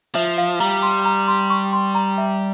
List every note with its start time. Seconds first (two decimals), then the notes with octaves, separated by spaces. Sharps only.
0.15 F3 E5
0.38 F5
0.60 G3 A#5
0.83 C6
1.05 A#5
1.28 C6
1.50 C#6
1.73 C6
1.95 A#5
2.18 E5